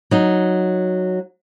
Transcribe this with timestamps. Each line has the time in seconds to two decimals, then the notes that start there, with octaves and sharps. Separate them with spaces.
0.11 F#3 D#4